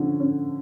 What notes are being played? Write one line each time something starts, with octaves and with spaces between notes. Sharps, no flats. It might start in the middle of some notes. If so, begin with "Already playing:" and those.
Already playing: D3 F3 C#4
C#4